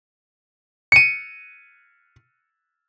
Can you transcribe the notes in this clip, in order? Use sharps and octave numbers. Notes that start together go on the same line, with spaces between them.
C#7 D#7